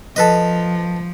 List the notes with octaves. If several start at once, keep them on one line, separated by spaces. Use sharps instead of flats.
F3 A4 B4 D#5